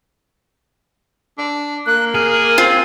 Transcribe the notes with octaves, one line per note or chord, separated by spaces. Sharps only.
D4
A#3 F#6
G#4 F6
C4 F4